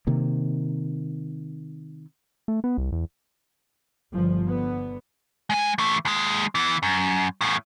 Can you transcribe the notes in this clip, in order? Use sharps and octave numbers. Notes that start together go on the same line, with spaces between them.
C3 D#3 A#3
A3
B3
C2
E2
G1 F3
D3 B3
G#3 G#5
E3 A3
D#2 G#3
E3 B3
F#2
E2 A2